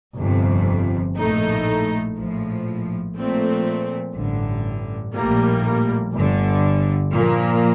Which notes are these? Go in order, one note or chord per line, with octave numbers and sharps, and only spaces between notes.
G1 F2 C3
A#1 A2 A3 D#4
A#1 A2 F3
A#2 F3 A3 C4
A1 G2 D3
A#1 A2 G3 A#3
G1 G2 D3
A#2 F3 A#3